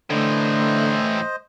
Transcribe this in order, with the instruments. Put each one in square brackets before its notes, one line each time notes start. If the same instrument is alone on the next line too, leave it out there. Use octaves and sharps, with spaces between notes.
[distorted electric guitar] A2 E3 [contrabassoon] D3 [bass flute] A3 [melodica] C5 D#5